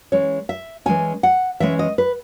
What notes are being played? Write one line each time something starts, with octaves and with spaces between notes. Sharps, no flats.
E3 G#3 C#4 C#5
E5
E3 G#3 C#4 G#5
F#5
E3 G#3 C#4 E5
D#5
B4